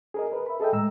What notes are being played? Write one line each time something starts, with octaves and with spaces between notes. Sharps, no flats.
G#4 A#4 D#5
A#4 B4
E5 B5
G#4 A4 D#5 E5 G5
A2 G#3 A#5 E6